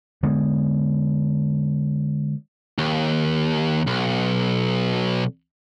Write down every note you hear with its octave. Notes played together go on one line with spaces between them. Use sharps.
D3 G#3 B3
D#2
B1